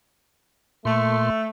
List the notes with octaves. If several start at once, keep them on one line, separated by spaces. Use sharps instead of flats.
A#2 A3 C6